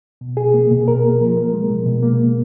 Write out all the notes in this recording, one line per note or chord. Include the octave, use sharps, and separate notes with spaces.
B2
G#4
A#3
B2
A#4
A#3
F3
A#4
G#3
B2
B2
A#3